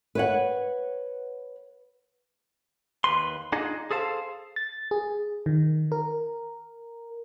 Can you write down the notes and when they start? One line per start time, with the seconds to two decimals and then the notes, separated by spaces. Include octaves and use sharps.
0.15 B4 C#5 F#5
3.04 D#2 G#2 B4 C6
3.52 D4 D#4 F4 G#4 D#5
3.91 G#4 A4 C5 F5 A5
4.56 A6
4.91 G#4
5.46 D#3
5.92 A#4